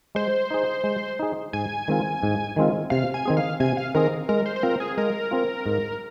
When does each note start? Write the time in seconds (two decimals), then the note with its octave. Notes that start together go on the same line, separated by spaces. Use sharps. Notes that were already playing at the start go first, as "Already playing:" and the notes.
0.15 G#3 C5
0.51 D#4 G#4
0.84 G#3
1.19 D#4 G#4
1.53 G#2 G#5
1.88 D#3 G#3 C4 F4
2.23 G#2
2.56 D#3 G#3 C4 F4
2.90 C3 F5
3.14 G#5
3.26 D#3 C4 G#4
3.37 F5
3.60 C3 G#5
3.77 F5
3.95 D#3 C4 G#4 A#4
4.29 G#3 A#4
4.46 C5
4.56 C5
4.63 C4 F4 A#4
4.80 G#4
4.98 G#3 A#4
5.31 C4 F4
5.66 G#2